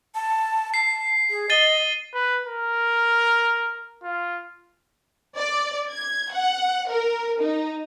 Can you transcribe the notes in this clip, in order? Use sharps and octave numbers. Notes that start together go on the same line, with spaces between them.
A5
A5 C7
G#4
D#5 A6 D#7 G7
B4
A#4
F4
D5
G#6
F#5
A#4
D#4